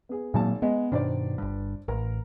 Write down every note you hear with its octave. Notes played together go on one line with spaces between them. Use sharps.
B3 G#4
G#1 A#2 F#3 A#3 A5
G#3 B3
G2 B2 D#3 D4 C5 D5
G1 G2
A1 A#4